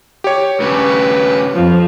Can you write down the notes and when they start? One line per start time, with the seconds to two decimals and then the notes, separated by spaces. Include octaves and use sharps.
0.24 G4 C#5
0.60 G2 C#3 B4
1.55 F2 F3